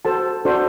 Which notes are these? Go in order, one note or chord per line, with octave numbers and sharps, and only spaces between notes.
F#4 A4 C5 A5
D4 F#4 A4 C5